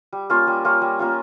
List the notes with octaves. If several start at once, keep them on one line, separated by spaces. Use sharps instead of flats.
G3
A#3 C#4 F4
G3
A#3 C#4 F4
G3
A#3 C#4 F4